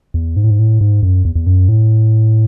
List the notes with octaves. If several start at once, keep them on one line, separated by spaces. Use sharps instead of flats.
E2
G#2
A2
G#2
A2
G#2
F#2
E2
E2
F#2
A2